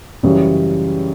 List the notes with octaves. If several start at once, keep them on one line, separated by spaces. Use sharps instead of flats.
F#2 C#3 E3 G3